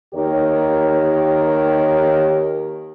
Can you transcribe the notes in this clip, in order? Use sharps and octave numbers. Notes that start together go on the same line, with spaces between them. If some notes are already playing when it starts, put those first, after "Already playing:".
D#2 D#3 G4 A#4 C#5